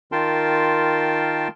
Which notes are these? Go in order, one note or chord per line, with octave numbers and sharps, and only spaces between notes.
D#3 F4 A#4 G5 A5 C6